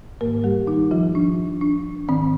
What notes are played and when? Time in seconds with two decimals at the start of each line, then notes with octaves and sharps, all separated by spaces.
0.21 G#2 D#3 A#3 A#4
0.44 G3 G4
0.67 D#3 D#4
0.91 F3 F4
1.15 D4
1.61 D4
2.08 G#2 D#3 C4